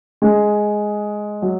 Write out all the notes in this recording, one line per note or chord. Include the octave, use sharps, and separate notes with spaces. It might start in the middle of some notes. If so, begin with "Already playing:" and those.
G#3
F#3